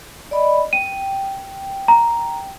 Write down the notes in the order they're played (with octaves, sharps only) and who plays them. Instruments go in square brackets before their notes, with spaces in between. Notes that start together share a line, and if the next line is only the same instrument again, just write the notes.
[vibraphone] D5 D#5 B5
[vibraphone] G5 [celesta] D#7
[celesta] A#5